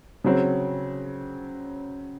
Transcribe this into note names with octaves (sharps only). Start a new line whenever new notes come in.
C#3 F#3 C4